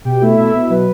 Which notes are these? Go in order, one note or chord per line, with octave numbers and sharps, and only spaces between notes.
B2 G4 G5
A3 E4 E5
B2
B2
F#3 B4